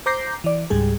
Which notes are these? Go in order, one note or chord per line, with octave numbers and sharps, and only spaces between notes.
C5 A#5 D6 G6 A#6 C7
E3 D5
C#2 G#2 G3 G#4